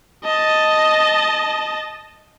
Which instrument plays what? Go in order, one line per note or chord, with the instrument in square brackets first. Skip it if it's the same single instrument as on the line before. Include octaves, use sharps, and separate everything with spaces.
[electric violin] D#5 A5